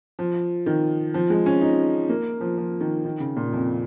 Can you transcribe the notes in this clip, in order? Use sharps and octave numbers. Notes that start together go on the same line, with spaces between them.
F3
D#3
F3
G#3
C#4
D#4
A#3
F3
F3
D#3
D#3
C#3
A#2
F2